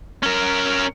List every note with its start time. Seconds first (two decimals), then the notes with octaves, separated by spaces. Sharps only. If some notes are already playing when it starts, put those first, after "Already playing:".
0.23 C#4 A#4